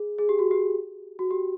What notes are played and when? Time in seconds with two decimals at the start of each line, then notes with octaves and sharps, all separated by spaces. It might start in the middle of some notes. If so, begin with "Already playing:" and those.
Already playing: G#4
0.18 G#4
0.29 G4
0.39 F#4
0.51 G4
1.19 F#4
1.31 G4